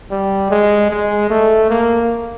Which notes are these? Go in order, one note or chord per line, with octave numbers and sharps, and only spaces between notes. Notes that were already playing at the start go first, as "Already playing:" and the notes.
G3
G#3
G#3
A3
A#3